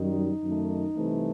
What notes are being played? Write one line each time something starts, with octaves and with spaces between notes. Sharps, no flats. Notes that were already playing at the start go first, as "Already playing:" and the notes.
Already playing: F#2 D#3 G3 D#4
F#2 D#3 A3
C2 C3 E3 A3